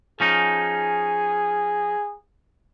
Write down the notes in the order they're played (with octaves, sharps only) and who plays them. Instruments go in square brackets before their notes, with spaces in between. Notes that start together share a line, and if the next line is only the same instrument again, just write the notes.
[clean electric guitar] F3 C#4 D#4 [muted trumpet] G#4